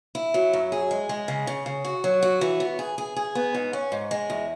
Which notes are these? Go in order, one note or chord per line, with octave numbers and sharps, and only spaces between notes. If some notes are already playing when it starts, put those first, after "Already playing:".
E4
F#3
F#2
G#4
G#3
G#3
C#3
C#3
C#3
F#4
F#3
F#4
E3
B3
G#4
G#4
G#4
B3
G#2
C#4
G#2
G#3
E2